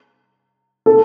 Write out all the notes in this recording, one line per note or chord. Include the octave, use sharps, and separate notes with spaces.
A4